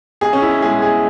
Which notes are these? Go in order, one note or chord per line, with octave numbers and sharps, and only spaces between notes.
B1 G#4
C#4
E4
B2 G#3 G#4
G#4